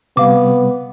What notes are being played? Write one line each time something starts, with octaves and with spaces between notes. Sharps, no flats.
C3 G3 B3 F5 D6